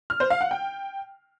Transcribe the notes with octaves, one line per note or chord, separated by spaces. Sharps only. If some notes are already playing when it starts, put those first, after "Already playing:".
F6
C5
F5
F#5
G5